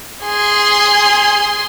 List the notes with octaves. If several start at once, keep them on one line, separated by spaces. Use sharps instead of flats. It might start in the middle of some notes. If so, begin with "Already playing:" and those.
G#4 C6